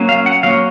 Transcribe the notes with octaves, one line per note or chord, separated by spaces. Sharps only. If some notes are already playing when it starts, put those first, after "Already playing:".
Already playing: F#3 A#3 C#4
F5
F#5
F#3 A#3 C#4 F5